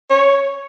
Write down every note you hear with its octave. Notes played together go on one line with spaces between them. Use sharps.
C#5